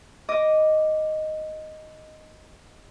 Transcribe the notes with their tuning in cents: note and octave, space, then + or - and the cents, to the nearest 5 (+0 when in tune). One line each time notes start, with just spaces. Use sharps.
D#5 +0 D6 +0